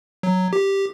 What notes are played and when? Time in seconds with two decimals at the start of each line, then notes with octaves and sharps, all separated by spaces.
0.23 F#3
0.53 G4